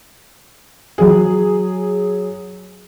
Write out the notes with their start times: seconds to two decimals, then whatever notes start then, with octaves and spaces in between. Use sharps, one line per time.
0.98 F#3 G#4